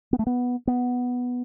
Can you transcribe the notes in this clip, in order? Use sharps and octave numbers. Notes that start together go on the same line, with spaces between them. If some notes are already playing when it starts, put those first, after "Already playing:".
B3
A3
B3
B3